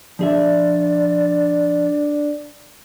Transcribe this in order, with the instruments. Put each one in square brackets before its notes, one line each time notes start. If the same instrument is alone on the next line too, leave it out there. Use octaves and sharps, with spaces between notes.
[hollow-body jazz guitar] F3 G#4 E5 [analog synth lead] D4 [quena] D5